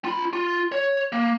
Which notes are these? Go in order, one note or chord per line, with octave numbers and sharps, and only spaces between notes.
F4 B5
F4
C#5
A#3